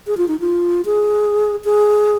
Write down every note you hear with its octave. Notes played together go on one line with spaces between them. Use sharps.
G#4
F4
D#4
F4
G#4
G#4